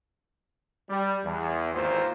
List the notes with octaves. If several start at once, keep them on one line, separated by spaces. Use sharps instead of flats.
G3
E2
G#1 D#2 E3 A#3 F4 C5